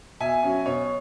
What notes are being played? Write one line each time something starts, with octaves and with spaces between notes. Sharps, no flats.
B2 E5 G#5
F#3 C#4
B2 C#5